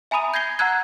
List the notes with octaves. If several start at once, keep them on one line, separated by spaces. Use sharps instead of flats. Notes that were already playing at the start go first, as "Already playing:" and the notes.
E5 G#5 A#5 B5 D#6 D#7
G6 G#6 A#6 C7 G7
F#5 A#5 E6 F#6 G#6